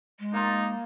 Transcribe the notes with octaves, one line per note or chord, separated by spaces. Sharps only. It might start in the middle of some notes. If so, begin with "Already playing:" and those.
G#3
A#3 D#4 F4